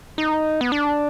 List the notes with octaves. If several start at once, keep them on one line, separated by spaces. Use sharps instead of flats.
D#4
B3
D4